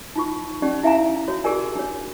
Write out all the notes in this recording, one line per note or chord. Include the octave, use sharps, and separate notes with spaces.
D#4 F4 C#6
C#4 D#4 G4 D5
E4 E5 F5 G#5 A#5
F#4 C#5
G4 G#4 A#4 D5 G#5
D4 C#5